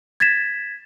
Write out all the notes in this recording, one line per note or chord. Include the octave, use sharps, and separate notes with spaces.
G#6 A6 B6 E7